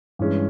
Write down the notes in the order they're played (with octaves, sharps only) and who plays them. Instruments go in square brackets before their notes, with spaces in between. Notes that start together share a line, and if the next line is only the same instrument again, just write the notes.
[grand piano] G2 E3 G#3 C#4